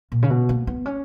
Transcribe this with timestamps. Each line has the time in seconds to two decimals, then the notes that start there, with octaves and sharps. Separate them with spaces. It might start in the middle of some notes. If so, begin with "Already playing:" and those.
0.12 A#2
0.22 C#3
0.30 B2
0.49 A#3
0.67 B3
0.86 C#4